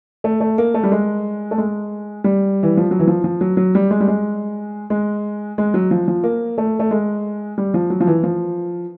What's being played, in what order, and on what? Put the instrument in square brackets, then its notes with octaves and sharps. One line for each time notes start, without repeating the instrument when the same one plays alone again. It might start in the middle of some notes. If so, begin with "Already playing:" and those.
[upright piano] A3
A3
A#3
A3
G3
G#3
A3
G#3
G3
E3
F3
F#3
E3
F3
F3
F#3
F#3
G3
G#3
G3
G#3
G#3
G#3
F#3
F3
F3
A#3
A3
A3
G#3
G3
F3
F#3
F3
E3
F3